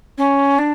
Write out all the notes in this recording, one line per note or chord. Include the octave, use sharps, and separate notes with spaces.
C#4
D4